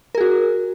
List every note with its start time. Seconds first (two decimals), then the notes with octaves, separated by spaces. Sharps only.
0.15 A#4
0.18 G#4
0.21 F#4